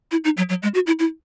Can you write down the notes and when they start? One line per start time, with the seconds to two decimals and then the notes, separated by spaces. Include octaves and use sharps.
0.11 E4
0.24 D#4
0.37 F#3
0.49 F#3
0.63 G#3
0.74 F#4
0.87 E4
0.99 E4